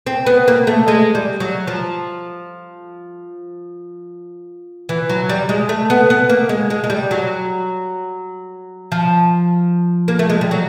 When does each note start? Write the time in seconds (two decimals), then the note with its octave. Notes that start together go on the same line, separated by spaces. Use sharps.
0.07 C4
0.27 B3
0.48 A#3
0.67 A3
0.88 G#3
1.15 G3
1.40 F#3
1.67 F3
4.89 E3
5.09 F#3
5.29 G3
5.49 G#3
5.69 A3
5.90 B3
6.10 B3
6.29 A#3
6.49 G#3
6.70 G#3
6.84 G#3
6.90 G3
7.11 F#3
8.92 F3
10.08 A#3
10.19 A3
10.30 G#3
10.41 G3
10.51 F#3